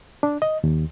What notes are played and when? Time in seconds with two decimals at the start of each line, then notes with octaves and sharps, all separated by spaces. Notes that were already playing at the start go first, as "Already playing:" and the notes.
0.23 D4
0.42 D#5
0.64 D#2